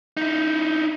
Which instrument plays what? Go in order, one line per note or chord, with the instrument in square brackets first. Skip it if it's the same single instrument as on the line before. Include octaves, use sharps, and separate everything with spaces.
[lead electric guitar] D#4 E4